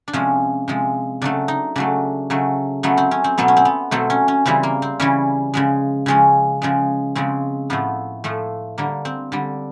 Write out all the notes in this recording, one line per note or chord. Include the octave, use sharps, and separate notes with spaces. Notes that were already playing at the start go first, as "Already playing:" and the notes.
D4
C3 F3 G#3 C#4
C3 F3 G#3
C#3 F#3 A3 D4
D#4
C#3 F#3 A3 D4
C#3 F#3 A3
C#3 F#3 A3 B3
C4
C#4
C4
B2 F#3 A3 B3
C#4
C4
B3
B2 F#3 A3 C4
C#4
C#4
C#3 E3 G3 C4
A#3
C4
C#3 E3 G3 C#4
C#3 F3 G#3
C#3 F3 G#3 C#4
C#3 F3 G#3
C#3 F3 G#3 C4
A2 F3 A3 B3
A2 F3 A3
D3 G3 A#3
C4
D3 G3